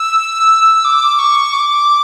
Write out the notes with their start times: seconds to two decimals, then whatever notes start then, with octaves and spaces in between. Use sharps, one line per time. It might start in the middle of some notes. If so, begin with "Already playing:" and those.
Already playing: E6
0.85 D6
1.19 C#6
1.53 D6